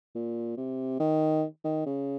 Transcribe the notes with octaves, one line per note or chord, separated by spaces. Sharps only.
A#2
C3
D#3
D#3
C#3